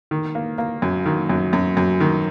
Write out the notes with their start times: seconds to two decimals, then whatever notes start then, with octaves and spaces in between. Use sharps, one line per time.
0.11 D#3
0.35 A#3
0.58 A#3
0.82 F#2
1.06 D#3
1.29 F#2
1.53 F#2
1.77 F#2
2.00 D#3